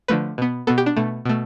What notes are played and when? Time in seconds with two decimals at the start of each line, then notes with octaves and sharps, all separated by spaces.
0.08 D3 F3 A3 B4
0.38 B2 B3
0.67 B2 B3 A4
0.78 G4
0.86 D4
0.96 B2 A3
1.25 B2 A3